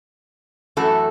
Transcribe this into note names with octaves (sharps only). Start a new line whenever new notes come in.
F#2 E3 A3 F#4 A4